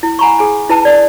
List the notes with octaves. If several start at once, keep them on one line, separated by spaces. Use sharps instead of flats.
E4
F#5 G#5 A#5 B5 C#6
G#4 G#5
E4 B4 A5
D5 D#6